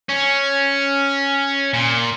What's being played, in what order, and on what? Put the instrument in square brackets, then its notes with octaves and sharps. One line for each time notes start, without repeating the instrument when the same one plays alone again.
[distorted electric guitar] C#4
A#2